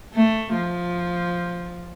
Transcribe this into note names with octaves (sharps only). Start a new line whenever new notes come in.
A3
F3